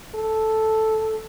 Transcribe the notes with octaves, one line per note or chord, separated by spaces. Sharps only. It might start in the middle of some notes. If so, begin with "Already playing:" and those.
A4